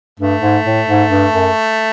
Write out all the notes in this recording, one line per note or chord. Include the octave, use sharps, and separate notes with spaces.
G2 A3
G#2
A2
G#2
G2
F#2